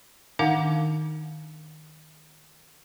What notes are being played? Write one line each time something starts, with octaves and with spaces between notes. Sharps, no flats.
D#3 D4 D#4 F5 F#5 D6